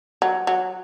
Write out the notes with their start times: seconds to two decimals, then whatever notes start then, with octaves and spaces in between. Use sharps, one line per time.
0.22 F#3
0.47 F#3